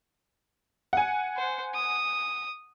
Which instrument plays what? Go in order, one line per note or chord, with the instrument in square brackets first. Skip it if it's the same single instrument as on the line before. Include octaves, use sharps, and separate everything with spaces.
[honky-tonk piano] F#5 G#5
[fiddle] C5
D#6